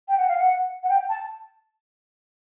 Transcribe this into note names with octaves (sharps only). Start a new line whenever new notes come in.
G5
F#5
F5
F#5
F#5
G5
A5